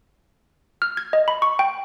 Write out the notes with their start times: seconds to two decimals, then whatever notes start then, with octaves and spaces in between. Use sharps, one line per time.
0.82 F6
0.97 G#6
1.13 D#5
1.28 B5
1.42 C#6
1.59 G5